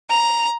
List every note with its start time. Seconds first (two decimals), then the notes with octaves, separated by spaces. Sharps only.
0.10 A#5